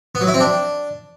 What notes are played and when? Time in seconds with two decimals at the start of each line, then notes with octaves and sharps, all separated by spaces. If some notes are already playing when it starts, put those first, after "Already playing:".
0.15 B3
0.21 F#3
0.28 E4
0.34 C4
0.40 D4